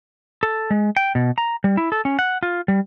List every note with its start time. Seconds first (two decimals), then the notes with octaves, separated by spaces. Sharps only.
0.43 A4
0.71 G#3
0.97 G5
1.15 B2
1.38 A#5
1.64 G3
1.77 E4
1.92 A4
2.05 C#4
2.19 F#5
2.43 F4
2.68 G3